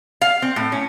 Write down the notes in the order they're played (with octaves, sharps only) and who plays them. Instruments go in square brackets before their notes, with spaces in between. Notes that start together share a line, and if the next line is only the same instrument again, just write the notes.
[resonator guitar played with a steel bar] F5
C4
A2
C#4